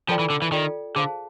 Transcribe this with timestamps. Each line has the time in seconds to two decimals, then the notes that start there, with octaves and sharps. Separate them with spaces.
0.08 F3 F4 A4 D5 G5
0.19 E3
0.30 D3
0.42 E3
0.52 D#3 F4 A4 D5 G5
0.95 D3 G#4 C5 F5 A5